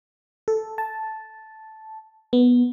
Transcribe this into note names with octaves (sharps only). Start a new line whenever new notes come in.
A4
A5
B3